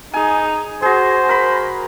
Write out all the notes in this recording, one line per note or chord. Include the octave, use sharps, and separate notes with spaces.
D#4 G#4 G#5
F#4 G#4 C5
A#4 B5